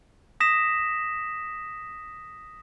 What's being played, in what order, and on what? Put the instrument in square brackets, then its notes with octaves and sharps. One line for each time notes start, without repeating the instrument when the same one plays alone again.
[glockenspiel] D#6 A#6 B6 E7